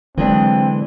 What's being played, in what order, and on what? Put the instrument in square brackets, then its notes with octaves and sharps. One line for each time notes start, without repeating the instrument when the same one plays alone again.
[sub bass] D3 [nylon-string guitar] E3 G#3 D4 [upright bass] F#3 [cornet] C4